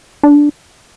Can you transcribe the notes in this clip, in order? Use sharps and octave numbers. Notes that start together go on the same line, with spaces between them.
D4